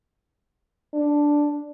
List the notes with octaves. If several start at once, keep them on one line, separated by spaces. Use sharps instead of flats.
D4